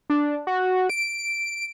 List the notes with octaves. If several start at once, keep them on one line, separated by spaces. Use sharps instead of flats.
D4
F#4
D7